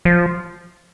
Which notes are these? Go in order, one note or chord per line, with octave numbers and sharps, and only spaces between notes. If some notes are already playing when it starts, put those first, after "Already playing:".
F3